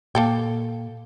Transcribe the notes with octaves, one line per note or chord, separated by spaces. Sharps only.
A#2 A#3 A4 G5